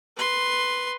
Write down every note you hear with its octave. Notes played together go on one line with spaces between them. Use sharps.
B4 C6